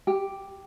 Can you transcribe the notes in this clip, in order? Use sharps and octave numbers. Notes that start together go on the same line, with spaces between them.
G4